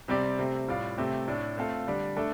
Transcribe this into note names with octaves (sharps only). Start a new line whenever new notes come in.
C3 G3 C4 G4 D5
C3 A3 C4
A2 G3 F4 D5 F5
C3 A3 C4 G4
A2 A3 D4
A3 C4 F4 A4 F5
D3 G3 D4
A3 D4 A4 D5